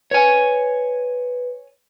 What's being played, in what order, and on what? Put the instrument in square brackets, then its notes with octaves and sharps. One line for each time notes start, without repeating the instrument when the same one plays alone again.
[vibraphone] B4 [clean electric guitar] C#5 G#5